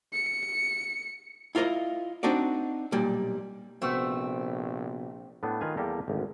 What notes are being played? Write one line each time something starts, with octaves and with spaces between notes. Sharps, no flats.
C#7
E4 F4 A#4 D5 D#5
C4 D4 D#4 F#4 D5
B1 A#2 G3
A#1 C3 A3 B3 C4 F#4
A2 A3 B3 D4
D#3 F4 B4 F5 G#5
E2 G3 A#3 G4 A4 A#5
G#1 D2